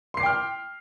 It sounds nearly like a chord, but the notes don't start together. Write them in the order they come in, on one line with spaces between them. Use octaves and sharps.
C6 C7 D6 G5 F6